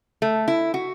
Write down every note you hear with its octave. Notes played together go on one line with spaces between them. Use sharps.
A3
E4
F#4